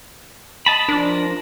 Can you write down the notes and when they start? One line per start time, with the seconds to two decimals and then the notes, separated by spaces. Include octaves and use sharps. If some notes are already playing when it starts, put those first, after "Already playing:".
0.66 D#5 A5 B5
0.89 F3 D4 A#4